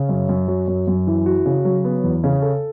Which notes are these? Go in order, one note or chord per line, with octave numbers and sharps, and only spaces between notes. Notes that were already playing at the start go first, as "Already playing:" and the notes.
Already playing: C#3
F#2
F#2
F#3
F#2
F#2
E3
F#4
C#3
F#3
B3
E2
C#3
A4